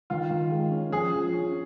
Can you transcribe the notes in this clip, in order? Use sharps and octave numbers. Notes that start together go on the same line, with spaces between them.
D#3 F4
D#3
G#3
C#4
F3 G#4
F3
C#4